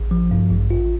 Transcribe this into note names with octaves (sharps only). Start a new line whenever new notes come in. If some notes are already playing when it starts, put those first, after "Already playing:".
Already playing: A1
F3
G2
A1
F4